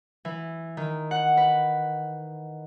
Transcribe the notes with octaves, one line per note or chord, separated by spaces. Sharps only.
E3
D#3
F#5
B4